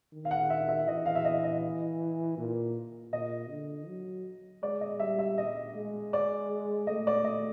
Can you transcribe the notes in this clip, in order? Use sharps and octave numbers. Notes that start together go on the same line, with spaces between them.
D#3
F5
F#5
E5
E5
E3 D#5
F5
E5
D#5
D#5
A#2
A#2 D#5
D3
F#3
G#3 D5
D#5
G3 E5
E5
D#5
G#3
D5
A3 D#5
D5
D#5